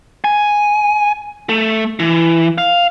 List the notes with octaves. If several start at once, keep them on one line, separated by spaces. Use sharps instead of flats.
G#5
A3
E3
F5